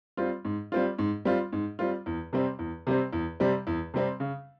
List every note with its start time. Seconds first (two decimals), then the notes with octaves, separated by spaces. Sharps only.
0.17 G3 C4 F4
0.45 G#2
0.72 G3 C4 F4
0.99 G#2
1.25 G3 C4 F4
1.53 G#2
1.79 G3 C4 F4
2.06 E2
2.33 C3 G3 C4
2.59 E2
2.87 C3 G3 C4
3.13 E2
3.40 C3 G3 C4
3.67 E2
3.94 C3 G3 C4
4.20 C#3